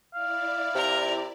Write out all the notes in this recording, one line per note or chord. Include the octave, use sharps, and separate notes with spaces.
E4 D5 F5
C3 A#4 A#5